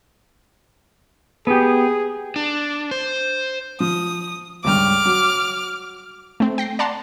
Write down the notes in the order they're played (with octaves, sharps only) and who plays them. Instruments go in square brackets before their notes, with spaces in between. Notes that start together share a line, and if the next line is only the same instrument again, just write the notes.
[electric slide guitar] B3 G4 [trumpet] G#4
[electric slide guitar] D4
C5
[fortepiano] F3 [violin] D#6
[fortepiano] C#2 G2 [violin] D6 F6
[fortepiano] F#3
[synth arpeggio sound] A3 C4
G5 A#6 C7
D5 F#5 A5 A#5 C6